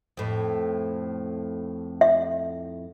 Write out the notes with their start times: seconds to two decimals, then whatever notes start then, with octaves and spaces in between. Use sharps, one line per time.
0.17 F2 A2
2.01 E5